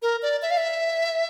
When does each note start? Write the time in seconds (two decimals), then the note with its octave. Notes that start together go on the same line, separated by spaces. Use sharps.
0.02 A#4
0.22 D5
0.42 E5
0.51 F5
0.57 E5